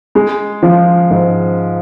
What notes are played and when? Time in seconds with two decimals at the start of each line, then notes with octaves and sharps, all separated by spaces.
0.15 G#3
0.63 F3
1.10 G#2